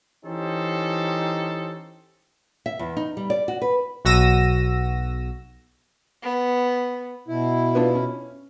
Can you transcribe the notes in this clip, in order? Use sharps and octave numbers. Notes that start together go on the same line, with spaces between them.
E3 C#4 D#4 G4 A4 C5
E5
E2
D#4
G3
D5
F#4
B4
B1 F#4 E6 A#6 D#7
B3
B2 E4
B3 D4 F4
C#4